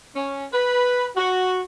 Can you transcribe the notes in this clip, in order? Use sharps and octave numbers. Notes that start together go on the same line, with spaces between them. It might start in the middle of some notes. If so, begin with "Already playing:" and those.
C#4
B4
F#4